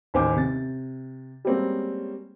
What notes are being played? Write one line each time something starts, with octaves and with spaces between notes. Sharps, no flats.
A1 D#2 C5 G#5 D6
C3 A6
G3 G#3 A#3 C4 C#4 F#4